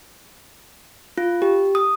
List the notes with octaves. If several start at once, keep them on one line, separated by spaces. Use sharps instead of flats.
F4
G4
D#6